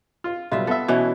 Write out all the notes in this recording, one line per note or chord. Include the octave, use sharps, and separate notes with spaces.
F4
B1 G3 F4 E5
B3 A4 E5
B2 E3 C#4